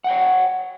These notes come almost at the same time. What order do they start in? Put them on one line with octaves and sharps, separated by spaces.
F#5 G5 C#5